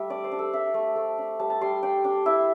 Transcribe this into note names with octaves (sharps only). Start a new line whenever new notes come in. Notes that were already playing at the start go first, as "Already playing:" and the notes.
Already playing: G3 A3 E5
D4 D5
C5
D4
A4
D4 E5
A3
A3
D4
G3 A5
A5
G3 C6
D4 G5
D4
E4 E5